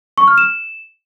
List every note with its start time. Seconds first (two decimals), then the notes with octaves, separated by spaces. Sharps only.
0.18 C#6
0.28 F6
0.38 E7